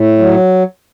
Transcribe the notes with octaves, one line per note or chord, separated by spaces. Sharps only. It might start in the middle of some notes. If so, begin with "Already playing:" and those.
Already playing: A2
F#3